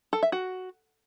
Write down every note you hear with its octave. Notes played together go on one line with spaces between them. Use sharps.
A4
E5
F#4